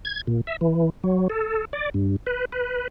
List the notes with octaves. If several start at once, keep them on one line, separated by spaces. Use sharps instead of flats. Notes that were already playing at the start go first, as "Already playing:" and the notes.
G#6
A#2
E5
E3
F#3
A4
D5
G2
B4
B4